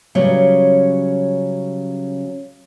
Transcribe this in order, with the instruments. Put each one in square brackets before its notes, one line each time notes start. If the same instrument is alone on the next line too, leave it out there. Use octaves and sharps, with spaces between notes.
[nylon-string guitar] C#3 F#3 G3 B3 C#4